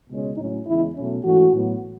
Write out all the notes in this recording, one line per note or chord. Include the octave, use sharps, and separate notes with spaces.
C#2 B2 G#3 C#4
A2 F#3 C#4 D#4
E2 C#3 G#3 E4
B2 F#3 A3 C#4
G#2 E3 A3 C#4 F#4
A2 F#3 B3